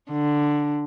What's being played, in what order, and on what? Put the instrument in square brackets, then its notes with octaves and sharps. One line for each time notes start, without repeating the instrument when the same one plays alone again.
[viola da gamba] D3